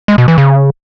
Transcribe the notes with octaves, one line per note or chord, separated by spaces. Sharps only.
G#3
B2
E3
C#3